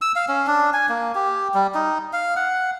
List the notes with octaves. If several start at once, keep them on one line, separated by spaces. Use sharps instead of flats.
E6
F5
C#4
D4
G#5
A#3
G4
G3
D#4
F5
F#5